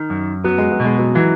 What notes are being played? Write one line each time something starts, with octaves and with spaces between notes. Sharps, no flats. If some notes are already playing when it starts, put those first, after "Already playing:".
Already playing: D#3
F#2
F#3 B3
G#3
F#3
B2 G#3
F#3
E3 F#3